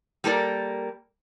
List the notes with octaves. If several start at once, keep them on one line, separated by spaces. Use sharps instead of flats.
G3 A#3 A4 A#4 D5